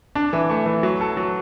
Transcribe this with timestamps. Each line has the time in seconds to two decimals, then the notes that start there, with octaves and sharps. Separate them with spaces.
0.15 D4
0.33 E3
0.50 A3
0.66 E3
0.83 F#3
1.01 A4
1.17 F#3